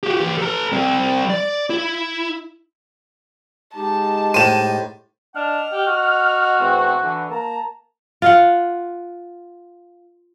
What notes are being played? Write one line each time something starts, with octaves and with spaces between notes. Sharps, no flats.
F#4 G4
E3 G4
A4 A#5
G3 C4
D5
E4
G#3 D#4 G4 A5
A2 C5 D#7 E7
D4 D#5 F#5 F6
G4
F#4
E2 A3 C4
D3 E3
A#3 A5 A#5
F4 F5 F#5